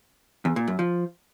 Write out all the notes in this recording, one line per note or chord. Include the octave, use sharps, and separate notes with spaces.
E2
A#2
F#2
F3